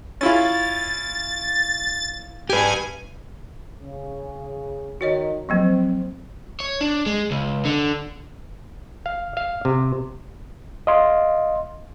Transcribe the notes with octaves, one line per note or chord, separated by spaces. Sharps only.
C#4 E4 F4 A6
G4 B4 G#5
C#3
D#3 F#4 C#5 D#5
F3 F#3 A#3 C4
C#5
D4
G#3
C#2
D3
F5
F5
C3
D#5 F5 C6